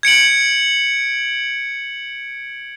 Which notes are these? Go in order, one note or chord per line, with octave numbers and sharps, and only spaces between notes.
G#6 C#7 D7 F#7